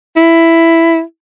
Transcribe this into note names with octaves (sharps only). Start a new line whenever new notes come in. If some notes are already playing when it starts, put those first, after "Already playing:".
E4